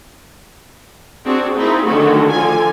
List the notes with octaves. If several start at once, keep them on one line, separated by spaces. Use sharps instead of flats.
C4 D4 F#4 G#4
A#3 C4 D#4 E4 G#4
D3 D#3 F#3 A3 C#4 F#4
D3 F3 F4 G#5